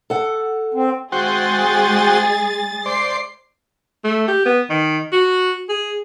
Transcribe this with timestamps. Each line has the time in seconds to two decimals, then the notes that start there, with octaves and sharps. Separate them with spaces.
0.10 A4 F#5
0.74 C4
1.12 G#3 F#4 G#4 C5 G5 A6
2.86 C5 D5 C7
4.04 A3
4.28 G4
4.46 B3
4.70 D#3
5.13 F#4
5.69 G#4